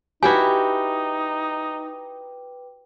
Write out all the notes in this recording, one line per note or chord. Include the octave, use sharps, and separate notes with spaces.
D#4 E4 F#4 G4 B4 G5 G#5 D6